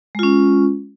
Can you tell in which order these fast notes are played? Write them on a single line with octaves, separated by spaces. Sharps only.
G#3 F4 C#4